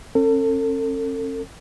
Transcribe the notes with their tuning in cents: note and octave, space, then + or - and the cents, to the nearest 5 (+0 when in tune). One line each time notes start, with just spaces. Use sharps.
C#4 -45 A4 +35